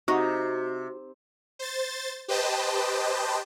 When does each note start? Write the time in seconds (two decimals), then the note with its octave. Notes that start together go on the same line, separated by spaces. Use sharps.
0.08 C3 D#4 F#4 D#5
1.59 C5 A6
2.28 G4 B4 C5 D#5 G5 A5